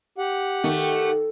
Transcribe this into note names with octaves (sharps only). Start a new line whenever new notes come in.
G4 F#5
D#3 A3